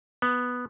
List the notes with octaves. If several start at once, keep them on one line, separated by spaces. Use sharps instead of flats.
B3